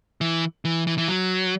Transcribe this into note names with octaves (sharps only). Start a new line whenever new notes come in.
E3
E3
E3
E3
F#3